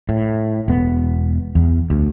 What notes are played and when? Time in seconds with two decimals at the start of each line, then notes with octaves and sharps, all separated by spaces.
0.09 A2
0.68 E1 B3
1.55 E2
1.90 D2